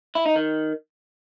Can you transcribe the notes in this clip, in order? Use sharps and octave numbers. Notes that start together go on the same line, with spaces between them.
E4
D#4
D#3